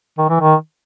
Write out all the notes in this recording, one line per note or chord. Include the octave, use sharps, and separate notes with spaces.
D#3
E3
D#3